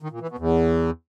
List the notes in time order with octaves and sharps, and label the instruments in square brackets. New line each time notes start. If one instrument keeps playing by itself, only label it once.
[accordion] D#3
A#2
E3
B2
E2